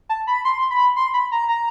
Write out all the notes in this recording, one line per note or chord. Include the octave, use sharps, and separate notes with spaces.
A5
B5
C6
B5
C6
B5
A#5
A#5